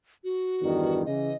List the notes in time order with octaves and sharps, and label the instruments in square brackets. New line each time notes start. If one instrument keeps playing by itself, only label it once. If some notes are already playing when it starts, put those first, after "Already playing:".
[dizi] F#4
[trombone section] E2 G2 D#3
[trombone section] C#3 E3 [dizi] D#5